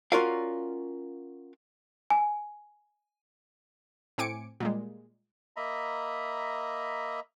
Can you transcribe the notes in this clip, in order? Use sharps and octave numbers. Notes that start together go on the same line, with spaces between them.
C#4 F4 F#4 A#4 D5 F5
G#5
A2 C4 G#5 D6 C#7 D7
A#2 G3 G#3
A#3 D#5 E5 A#5 B5